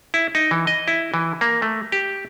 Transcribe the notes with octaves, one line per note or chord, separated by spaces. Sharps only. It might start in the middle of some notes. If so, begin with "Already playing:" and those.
E4
D#4
E3
D#5
E4
E3
A#3
A3
G4